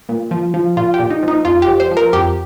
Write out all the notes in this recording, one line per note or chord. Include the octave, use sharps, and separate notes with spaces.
A#2
F3
F3
A#2 F4
G4
A#2
D#4
F3 D#4
F2 F4
G4
F3
C5
F3
A#4
F2 G4